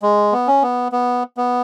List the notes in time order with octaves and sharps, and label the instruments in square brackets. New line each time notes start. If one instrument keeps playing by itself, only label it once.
[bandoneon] G#3
B3
C#4
B3
B3
B3